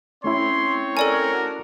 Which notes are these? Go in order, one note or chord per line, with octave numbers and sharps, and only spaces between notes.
A3 C4 C#4 E4 C#5 C6
A4 A#4 D5 G#5
D4 F#4